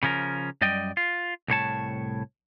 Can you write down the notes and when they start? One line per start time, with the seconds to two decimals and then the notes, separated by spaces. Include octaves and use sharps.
0.03 C#3 F3 C#4 A#4
0.61 F#2 G3 D5 D#5 G5
0.97 F4
1.48 C2 A2 C#5 A5